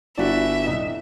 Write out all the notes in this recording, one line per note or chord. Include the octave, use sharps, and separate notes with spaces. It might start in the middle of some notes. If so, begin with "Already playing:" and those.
G1 E4 F#4 D5 E5
D#1 C2 D#5